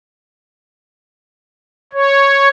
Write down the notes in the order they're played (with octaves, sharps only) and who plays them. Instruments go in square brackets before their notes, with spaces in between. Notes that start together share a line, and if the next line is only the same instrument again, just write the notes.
[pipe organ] C#5